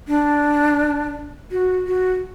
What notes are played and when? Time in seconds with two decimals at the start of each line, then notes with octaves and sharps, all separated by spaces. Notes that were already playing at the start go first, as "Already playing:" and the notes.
0.08 D4
1.51 F#4
1.87 F#4